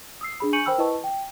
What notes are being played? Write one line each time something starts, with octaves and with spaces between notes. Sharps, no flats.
D#6 E6 C7
D4 G#4 B5
G#5 C#6 G6 C#7 D#7 F#7
A#4 C5 G5 B5 E6 F6
E4 B4 D#5 A5 C#6
G5